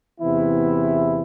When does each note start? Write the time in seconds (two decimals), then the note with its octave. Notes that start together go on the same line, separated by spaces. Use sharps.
0.21 E2 C3 E3 B3 E4